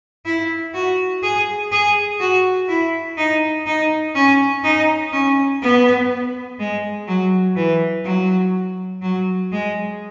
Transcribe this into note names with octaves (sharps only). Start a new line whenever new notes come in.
E4
F#4
G#4
G#4
F#4
E4
D#4
D#4
C#4
D#4
C#4
B3
G#3
F#3
E3
F#3
F#3
G#3